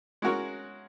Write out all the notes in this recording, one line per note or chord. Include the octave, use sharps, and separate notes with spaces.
G#3 C#4 F#4 A#4 C#5